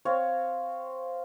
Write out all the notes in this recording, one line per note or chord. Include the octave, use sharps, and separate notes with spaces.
C4 C#5 F5